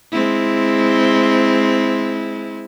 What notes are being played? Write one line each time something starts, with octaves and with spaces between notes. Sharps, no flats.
G#3 C4 E4